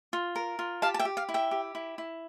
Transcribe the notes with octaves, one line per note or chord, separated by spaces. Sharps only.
F4
A#4
F4
G4 F5 A5
A5
E5 G5
G4
F5
E4
E5 G5
G4
E4
E4